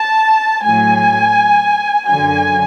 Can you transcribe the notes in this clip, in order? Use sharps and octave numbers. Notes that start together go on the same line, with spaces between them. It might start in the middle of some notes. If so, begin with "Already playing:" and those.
Already playing: A5
A2 F#3 G#5
F#2 D3 F#3 G#5